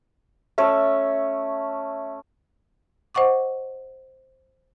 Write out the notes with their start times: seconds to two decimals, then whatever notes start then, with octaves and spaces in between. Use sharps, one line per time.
0.58 A3 C#4 C#5 E5
3.15 C5 D#5 F#5 C#6 D6